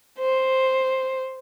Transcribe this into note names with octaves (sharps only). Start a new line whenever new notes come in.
C5